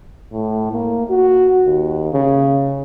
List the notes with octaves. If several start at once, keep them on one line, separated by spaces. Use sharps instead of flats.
A2
A#3
F#4
D#2
C#3